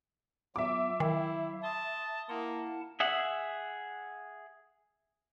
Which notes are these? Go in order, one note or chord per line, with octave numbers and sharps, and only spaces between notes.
F#3 B3 F4 E5 D6
D#3 F#3 E4 F5
A5 C6 D#6
A#3 E4 F#5 A5
G#4 E5 F#5